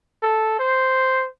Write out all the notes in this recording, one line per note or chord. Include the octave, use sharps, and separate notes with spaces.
A4
C5